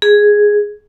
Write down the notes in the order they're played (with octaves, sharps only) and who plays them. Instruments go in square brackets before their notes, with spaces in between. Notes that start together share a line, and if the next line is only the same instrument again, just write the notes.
[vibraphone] G#4